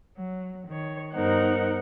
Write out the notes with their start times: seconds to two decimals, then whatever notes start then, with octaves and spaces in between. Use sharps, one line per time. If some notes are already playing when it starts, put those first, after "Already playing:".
0.17 F#3
0.67 D#3 C#5
1.13 G2 B3 D#4 A#4 C5 F#5